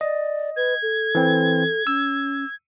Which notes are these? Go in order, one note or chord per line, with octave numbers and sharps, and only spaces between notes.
D5 D#5
B4 G#6
A4
E3 C4
C#4 E6